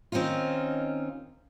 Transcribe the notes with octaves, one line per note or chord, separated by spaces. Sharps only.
D#3 C4 C#4 D#4 F4